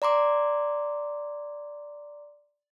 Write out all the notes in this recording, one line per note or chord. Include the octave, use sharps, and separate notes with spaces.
D5 A#5 C6 D6